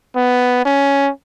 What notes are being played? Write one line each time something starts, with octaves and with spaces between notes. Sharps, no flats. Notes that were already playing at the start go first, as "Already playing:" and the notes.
B3
C#4